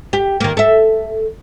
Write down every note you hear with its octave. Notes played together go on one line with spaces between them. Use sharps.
G4
D#3 A#3
A4 E5